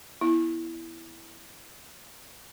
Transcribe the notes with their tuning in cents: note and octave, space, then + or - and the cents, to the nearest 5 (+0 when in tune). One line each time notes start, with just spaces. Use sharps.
B3 -15 E4 +0